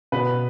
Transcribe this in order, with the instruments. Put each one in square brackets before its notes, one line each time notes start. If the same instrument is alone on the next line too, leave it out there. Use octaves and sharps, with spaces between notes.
[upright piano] B2 B4